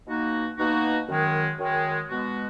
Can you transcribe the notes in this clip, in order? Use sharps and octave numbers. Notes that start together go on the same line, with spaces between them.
B2 A#3 D#4 F#4
B2 A#3 D#4 F#4
F#2 D#3 G#3
F#2 D#3 G#3
B2 G#3 B3 F#4